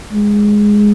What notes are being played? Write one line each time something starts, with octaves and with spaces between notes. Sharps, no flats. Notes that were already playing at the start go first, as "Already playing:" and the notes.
G#3